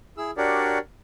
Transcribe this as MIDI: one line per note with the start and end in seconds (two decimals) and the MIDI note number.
0.17 0.31 64
0.17 0.31 68
0.17 0.31 88
0.37 0.78 62
0.37 0.78 66
0.37 0.78 67
0.37 0.78 70
0.37 0.78 73
0.37 0.78 74